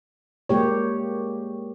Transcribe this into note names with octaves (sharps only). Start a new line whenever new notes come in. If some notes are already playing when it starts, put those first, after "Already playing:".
G#3 A#3 G4 C#5